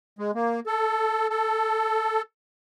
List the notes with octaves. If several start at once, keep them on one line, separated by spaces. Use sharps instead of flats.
G#3
A#3
A4
A4